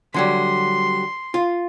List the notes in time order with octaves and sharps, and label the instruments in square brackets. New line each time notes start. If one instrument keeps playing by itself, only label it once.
[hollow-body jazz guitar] D3 F#3 G3 [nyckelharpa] C6
[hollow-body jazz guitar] F4